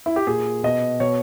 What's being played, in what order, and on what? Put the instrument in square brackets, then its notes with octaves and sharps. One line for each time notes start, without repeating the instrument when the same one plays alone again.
[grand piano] E4
G4
A#2 G#4
B2 D#5
B2 C#5